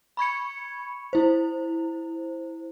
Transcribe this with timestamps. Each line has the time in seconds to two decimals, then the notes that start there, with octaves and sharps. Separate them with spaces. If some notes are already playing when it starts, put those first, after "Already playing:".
0.17 B5 C#6 G#6 C#7
1.13 E4 C5